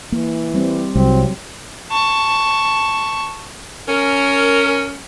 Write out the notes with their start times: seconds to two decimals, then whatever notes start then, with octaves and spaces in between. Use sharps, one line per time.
0.12 E3 A#3
0.54 G3 C4
0.95 C2 F#3 G3 C4
1.91 A5 C#6
3.88 C#4 A#4